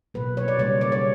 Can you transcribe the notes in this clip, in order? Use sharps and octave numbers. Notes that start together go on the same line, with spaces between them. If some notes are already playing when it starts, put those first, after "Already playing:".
B2 F#3 A#3 B4
C#5
D5
C#3 G3 A#3 C#5
D5
C#5